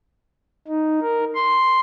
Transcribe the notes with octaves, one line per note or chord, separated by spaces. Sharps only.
D#4
A#4
C6